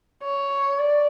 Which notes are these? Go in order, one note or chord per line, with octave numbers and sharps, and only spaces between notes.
C#5
D5